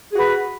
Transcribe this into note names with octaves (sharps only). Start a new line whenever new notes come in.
F#4 G#4 B4